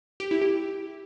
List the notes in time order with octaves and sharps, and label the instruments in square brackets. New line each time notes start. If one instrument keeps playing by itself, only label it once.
[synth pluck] G4
E4
G4